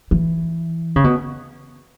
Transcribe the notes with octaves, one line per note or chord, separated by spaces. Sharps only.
E3
C#3
B2